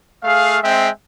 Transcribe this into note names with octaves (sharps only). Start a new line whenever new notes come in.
A3 G#4 F5
G#3 C4 E5 G5